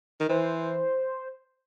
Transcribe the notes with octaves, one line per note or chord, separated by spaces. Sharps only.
D#3
E3 C5